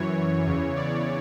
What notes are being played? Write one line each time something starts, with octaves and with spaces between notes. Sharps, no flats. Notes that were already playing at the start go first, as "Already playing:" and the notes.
Already playing: F#2 E3 C#5
E2 C#3 E3
D5